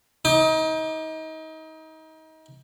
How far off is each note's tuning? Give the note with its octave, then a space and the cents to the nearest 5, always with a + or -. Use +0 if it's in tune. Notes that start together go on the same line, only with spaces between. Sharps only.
D#4 +30 D6 +45